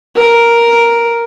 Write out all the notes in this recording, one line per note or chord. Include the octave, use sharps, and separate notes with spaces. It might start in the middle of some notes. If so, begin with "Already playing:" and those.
A#4